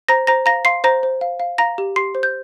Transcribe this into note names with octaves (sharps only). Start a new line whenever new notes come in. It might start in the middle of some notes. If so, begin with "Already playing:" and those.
C5 A#5 A#6
C5 A#5 A#6
F5 A#5 A#6
F5 C6 C7
C5 A#5 A#6
C5
F5
F5
F5 A#5 A#6
G4
G4 C6 C7
C5
G6